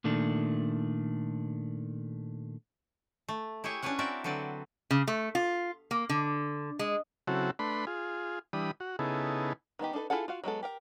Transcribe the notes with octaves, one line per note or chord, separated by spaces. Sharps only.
A#2 D#3 A3 D4
A3
E4 G4 G#4 C#5 E5
C#4 D4 E4 B4 C#5 F#5
C4 F#4 A#4 D5 E5
D3 F#3 C4 B4 D5
C#3
A3
F4
A#3
D3
G#3
C#3 F#3 C4 E4 F#4 A4
A3 D4 B4 B5 C6
F4 G#4
E3 G3 D4 B5 D#6
F#4
C#3 B3 D#4 E4 G#4 A4
D#3 B3 D#4 G4
D4 D#4 A4 B4
E4 F4 G#4 A4 F#5
F4 F#4 F5
F#3 G#3 B3 A4
G4 A#4 G5